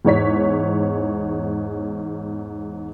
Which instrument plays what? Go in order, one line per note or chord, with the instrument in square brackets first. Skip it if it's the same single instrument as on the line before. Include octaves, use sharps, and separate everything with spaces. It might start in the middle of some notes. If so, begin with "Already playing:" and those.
[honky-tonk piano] E2 G#2 C#5 B6